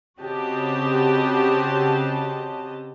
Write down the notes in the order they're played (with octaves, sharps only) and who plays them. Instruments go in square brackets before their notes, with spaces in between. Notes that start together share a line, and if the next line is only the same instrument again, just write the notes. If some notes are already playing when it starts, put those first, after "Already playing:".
[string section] C#3 C4 F#4 G4 D#5 A5